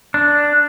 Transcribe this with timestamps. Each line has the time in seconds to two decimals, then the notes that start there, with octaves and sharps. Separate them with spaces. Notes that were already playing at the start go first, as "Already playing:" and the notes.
0.14 D4